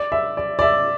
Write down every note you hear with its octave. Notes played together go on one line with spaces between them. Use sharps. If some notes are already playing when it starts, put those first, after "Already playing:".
Already playing: D5
E5
D5
D5
E5